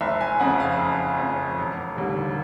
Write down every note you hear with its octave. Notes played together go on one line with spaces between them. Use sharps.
F#1 E5
G#5
F2 C#3 F#5
F5
F#1
F2 C#3
E1
D#2 D3 G3